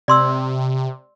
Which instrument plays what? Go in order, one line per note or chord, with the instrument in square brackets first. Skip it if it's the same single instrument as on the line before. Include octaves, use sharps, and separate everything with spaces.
[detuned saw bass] C3 [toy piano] D5 C6 E6